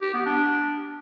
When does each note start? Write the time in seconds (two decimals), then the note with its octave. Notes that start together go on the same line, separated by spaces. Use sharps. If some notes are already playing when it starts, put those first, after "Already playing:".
0.02 G4
0.14 B3
0.26 D4